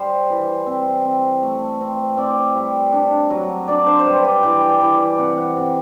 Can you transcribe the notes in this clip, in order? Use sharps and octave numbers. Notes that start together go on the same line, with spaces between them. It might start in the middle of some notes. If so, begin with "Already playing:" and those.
Already playing: G3 C5
E3
C4
C4
A3
C4
C4 D5
G3
D4
F#3
D4 D5
C5
C5
G3 B4
D5
E3 G5
D5
E3
D5
C3 F#5
F#5
C3 G5